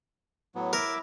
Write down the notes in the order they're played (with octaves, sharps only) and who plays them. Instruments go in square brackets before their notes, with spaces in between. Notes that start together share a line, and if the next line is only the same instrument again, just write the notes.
[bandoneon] A2 F#3 B3
[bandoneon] E4 E5 D6 [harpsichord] A#4